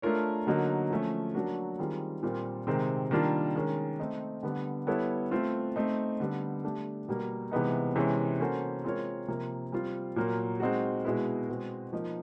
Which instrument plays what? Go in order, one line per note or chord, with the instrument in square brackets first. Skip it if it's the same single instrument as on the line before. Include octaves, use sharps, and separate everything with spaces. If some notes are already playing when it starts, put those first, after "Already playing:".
[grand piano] A3 D4 F4 A#4 C#5
D3 F#3 A#3 D#4
F3 A3 C#4
F#3 A#3 D4 F#4
D#3 G3 C4 F4 G#4
A#2 G3 C4 F4 A#4
C3 D#3 G#3 C4
D#3 G3 A#3 D4 F4
D#3 G#3 C#4
A3 C4 D#4
D3 G3 B3
G3 B3 E4 A4 C#5
A3 C4 F4
A3 C4 D#4
D3 G3 B3
A3 D4 G4
B2 G3 A#3
C3 E3 G#3 B3 D#4
C3 E3 G#3 C#4
A#3 C#4 F#4 A4 C5
G#3 C4 F4 A#4 C#5
C3 F3 A#3
G3 C4 F4
A#2 F#3 A#3
G#3 C4 D#4 F#4
B2 G#3 B3 E4
B2 G#3 C4
F3 A#3 D#4